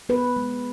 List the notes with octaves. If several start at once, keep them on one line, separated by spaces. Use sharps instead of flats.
B3 B4
G#3